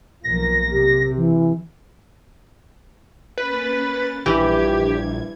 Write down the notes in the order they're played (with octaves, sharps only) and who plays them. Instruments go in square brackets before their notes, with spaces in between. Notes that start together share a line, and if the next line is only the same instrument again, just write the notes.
[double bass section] B1 F3 A#3 [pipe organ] A#6
[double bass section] C3 [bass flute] G4
[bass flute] E3
[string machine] A#3 C#4 A6 [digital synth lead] B4
[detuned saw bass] A#1 [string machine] G2 G#6 [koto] E3 [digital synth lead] G4